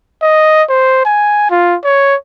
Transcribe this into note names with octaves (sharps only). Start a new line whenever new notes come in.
D#5
C5
G#5
F4
C#5